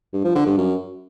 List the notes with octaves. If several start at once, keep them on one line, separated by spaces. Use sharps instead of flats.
G2
F3
D3
G2
F#2